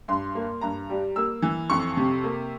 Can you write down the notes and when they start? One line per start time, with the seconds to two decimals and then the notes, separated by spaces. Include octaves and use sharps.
0.08 G2 C6
0.35 A#3
0.61 G2 A#5
0.90 G3
1.16 A#3 E6
1.42 E3
1.70 F2 C#6
1.97 C3
2.24 A#3